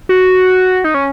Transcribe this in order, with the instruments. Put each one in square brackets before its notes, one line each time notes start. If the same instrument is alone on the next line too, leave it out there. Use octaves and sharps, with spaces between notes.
[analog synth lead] F#4
D#4
C#4